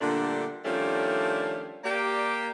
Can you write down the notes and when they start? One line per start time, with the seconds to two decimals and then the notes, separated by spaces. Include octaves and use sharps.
0.01 A#2 D3 G3 A3 D4
0.65 D#3 F3 G3 A3 C#4 D4
1.84 A#3 G4 D5